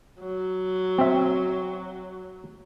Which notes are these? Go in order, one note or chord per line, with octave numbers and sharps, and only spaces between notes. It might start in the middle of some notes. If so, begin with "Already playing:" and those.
F#3
C4 E5